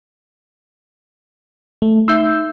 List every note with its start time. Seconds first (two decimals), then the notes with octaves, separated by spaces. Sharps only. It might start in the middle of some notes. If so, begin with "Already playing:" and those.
1.82 A3
2.08 D#4 E5 E6 G6